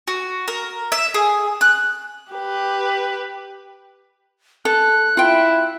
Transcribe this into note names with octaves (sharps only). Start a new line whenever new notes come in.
F#4
A#4
E5
G#4
F#6
G4 B4
A4 F#6
E4 F4 G5